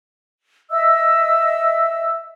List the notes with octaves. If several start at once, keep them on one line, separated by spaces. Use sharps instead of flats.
D#5 E5 E6